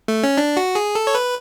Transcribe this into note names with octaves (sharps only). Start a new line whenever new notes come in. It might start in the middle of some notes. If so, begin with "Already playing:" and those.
A3
C#4
D4
F#4
G#4
A4
C#5
B4